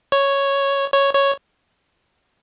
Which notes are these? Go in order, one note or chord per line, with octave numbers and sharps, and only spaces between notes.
C#5
C#5
C#5